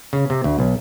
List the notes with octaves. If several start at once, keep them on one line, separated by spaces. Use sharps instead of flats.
C#3
C3
D2
B1